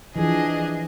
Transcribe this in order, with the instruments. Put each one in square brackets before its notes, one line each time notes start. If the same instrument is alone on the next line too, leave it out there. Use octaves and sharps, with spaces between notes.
[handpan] E3 F3 [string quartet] D4 G#4 D#5